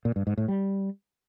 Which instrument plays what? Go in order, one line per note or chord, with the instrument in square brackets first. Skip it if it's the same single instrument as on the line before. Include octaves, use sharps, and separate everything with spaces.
[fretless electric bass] A#2
G2
G#2
A2
G3